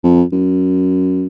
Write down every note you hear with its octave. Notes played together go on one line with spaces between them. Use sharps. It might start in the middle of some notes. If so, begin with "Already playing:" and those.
F2
F#2